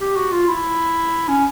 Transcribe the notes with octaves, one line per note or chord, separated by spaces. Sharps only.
G4
F#4
F4
E4
C#4